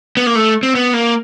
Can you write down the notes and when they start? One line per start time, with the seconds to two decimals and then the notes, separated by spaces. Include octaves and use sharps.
0.17 B3
0.26 A#3
0.35 A3
0.63 C4
0.75 B3
0.94 A#3